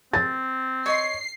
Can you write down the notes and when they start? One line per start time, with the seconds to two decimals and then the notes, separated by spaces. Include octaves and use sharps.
0.13 C4 A6
0.86 C#5 D#5 C6 C7